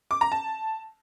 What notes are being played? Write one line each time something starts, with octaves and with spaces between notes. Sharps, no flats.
D6
A#5
A5